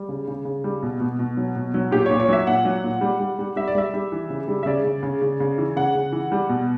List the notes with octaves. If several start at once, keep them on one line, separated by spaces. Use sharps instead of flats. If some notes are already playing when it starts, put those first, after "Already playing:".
Already playing: G3
C#3
C#3
C#3
G3
B2
B2
B2
F#3
B2
F#3
A#2 G4
A#2 C#5
C#5
F#3 E5
A#2 F#5
F#3
A#2
G3
G3
G3
G3 E5
D5
G3 E5
G3
E3
C#3
G3
E5
C#3 D5
C#3
C#3
C#3
C#3
E3
C#3 F#5
C#3
E3
G3
B2